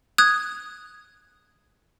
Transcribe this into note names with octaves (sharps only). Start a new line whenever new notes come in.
D#6 F#6 G#6